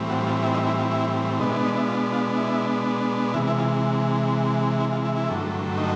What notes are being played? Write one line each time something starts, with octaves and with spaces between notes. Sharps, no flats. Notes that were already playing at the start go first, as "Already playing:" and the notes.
Already playing: A2 E3 G3 C4
F#4
F4
E4
D#4
E4
F4
E4
B2 G#3 B3 D4 D#4
E4
D#4
E4
F4
F4
E4
C3 E3 G#3 E4
E4
F4
E4
F4
E4
E4
G2 D3 F#3 A3
D#4